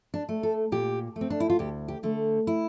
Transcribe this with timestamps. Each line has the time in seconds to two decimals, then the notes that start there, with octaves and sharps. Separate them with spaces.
0.14 D4
0.29 A3
0.43 A4
0.72 A#2 G4
1.16 A3
1.21 C4
1.30 D4
1.40 E4
1.50 F4
1.59 D2 G4
1.88 G4
2.03 D3 A3
2.47 E4